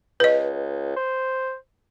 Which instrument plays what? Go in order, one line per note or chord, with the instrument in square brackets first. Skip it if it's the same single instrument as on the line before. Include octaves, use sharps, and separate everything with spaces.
[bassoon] C#2 [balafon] B4 D#5
[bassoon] C5